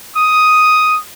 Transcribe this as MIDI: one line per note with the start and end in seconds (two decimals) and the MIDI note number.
0.16 0.97 87